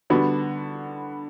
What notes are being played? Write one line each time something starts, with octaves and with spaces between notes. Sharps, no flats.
D3 G3 B3 D4 F#4